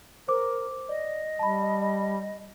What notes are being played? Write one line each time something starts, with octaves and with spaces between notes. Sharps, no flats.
A#4 C5 D6
D5 D#5
G3 A5 B5